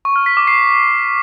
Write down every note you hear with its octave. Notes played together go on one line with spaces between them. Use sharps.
C#6
F6
B6
D6
C7